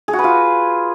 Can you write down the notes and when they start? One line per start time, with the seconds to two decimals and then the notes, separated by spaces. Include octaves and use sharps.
0.08 G#4
0.13 F#4
0.19 B4
0.24 F4